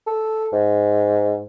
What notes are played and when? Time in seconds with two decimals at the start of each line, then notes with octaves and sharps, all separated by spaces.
0.07 A4
0.53 G#2